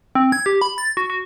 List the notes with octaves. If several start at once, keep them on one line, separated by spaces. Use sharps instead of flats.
C4
G#6
G4
B5
A6
F#4
F#4